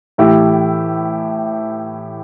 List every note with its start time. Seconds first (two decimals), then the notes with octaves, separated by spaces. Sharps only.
0.18 A2 E3 A3 E4 G4